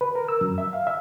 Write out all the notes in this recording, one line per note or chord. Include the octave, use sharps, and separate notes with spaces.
B4
A#4
E6
F#2
E5
F5
E5